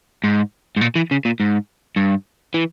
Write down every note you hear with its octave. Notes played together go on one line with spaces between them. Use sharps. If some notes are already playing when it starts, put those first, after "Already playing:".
G#2
G#2
A#2
E3
C#3
A#2
G#2
G2
E3